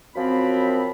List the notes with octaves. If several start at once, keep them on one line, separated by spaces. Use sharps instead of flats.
F#2 F3 C4 B5